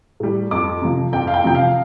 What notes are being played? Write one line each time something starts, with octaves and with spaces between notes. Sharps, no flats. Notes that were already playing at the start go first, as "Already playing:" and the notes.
A2 G3
F2 D6
C3 F3
F2 G5
F5
G5
C3 F3 G5
F5